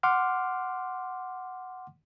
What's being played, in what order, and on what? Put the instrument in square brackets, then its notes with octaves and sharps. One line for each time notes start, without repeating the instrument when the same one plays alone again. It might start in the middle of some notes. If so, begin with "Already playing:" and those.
[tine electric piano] F#5 C6 D6 F6